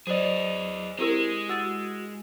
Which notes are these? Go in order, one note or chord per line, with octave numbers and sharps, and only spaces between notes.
F#3 G#4 B4 C5 D5 D#5
G#3 C4 E4 G4 G#4 A#4
F#4 E6 A6 D#7